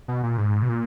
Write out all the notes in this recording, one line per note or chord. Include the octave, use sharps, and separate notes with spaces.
B2
A#2
G#2
B2
A#2